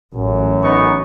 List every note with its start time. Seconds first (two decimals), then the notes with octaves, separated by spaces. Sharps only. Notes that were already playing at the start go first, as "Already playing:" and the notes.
0.15 A1 F#2
0.63 B3 D#4 C#6